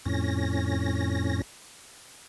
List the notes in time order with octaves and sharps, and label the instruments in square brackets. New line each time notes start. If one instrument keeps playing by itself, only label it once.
[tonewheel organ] F2 A2 C#4 A#6